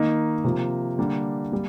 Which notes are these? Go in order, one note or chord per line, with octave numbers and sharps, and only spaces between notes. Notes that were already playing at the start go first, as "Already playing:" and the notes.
Already playing: D#3 A#3 D#4
C3 F3 A#3
D3 G3 A#3 D4
G3 A#3